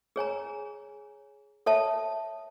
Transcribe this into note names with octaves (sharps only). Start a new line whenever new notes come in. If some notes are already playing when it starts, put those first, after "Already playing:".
G#4 C#5 G#5 A#5
A4 C#5 E5 A5